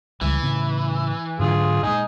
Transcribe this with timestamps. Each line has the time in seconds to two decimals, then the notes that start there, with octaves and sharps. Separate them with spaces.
0.21 C#2 E3 G3 G#3
0.43 A2 C#3 B3
1.39 G#2 D3 F#3 F4 G#4
1.83 A#2 G#3 D#4 D#5 G#5